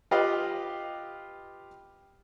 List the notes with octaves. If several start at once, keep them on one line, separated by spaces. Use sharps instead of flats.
F4 G4 B4 D#5 F5